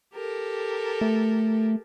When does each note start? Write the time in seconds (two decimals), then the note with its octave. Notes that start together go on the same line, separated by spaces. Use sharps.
0.14 G4 A4 A#4
1.01 A3